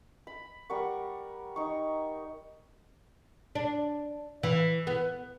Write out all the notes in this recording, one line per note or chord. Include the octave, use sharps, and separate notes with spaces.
B5
G3 A#4 F#5 C#6
D#4 C#6
D4
E3
B3